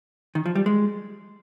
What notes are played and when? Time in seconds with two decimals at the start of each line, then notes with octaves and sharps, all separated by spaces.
0.35 D#3
0.46 F3
0.55 G3
0.66 G#3